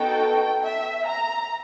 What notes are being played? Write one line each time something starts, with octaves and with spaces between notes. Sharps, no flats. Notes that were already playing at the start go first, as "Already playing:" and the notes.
Already playing: B3 D#4 F#4 A4 G5
E5
A#5